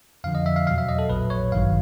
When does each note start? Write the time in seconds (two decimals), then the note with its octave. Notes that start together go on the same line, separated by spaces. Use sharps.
0.24 F2 D3 F3 F5
0.35 D#5
0.46 E5
0.56 F5
0.67 E2 B2 F#3 F5
0.78 E5
0.89 D#5
0.99 A4
1.09 A#1 A#2 F#3 B4
1.30 C#5
1.52 G#1 G2 D#3 F#3 F5